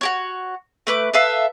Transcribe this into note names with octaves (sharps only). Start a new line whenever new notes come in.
F#4 G4 C#5
A3 B4 D6
A4 B4 E5 F5